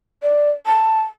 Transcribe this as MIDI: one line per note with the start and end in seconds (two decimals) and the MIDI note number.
0.22 0.50 74
0.66 1.02 81